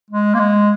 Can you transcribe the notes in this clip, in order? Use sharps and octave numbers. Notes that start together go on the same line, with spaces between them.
G#3
A#3
G#3